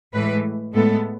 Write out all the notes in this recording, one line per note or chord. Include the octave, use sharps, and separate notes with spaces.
A2 E3 G#3 B4
A2 G#3 B3 A4